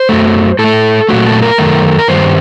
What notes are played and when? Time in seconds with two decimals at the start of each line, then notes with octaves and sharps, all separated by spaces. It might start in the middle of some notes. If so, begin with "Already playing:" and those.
Already playing: C5
0.09 F#2 F#3 A3
0.59 A2 A4
0.64 A3
1.09 A#2 F#3 A3 F#4
1.26 A4
1.42 A#4
1.58 F#2 D#3 A3
1.98 A#4
2.08 G2 D#3 G3 C5